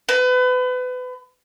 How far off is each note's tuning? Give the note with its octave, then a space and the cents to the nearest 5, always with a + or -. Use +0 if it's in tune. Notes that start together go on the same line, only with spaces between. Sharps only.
B4 +30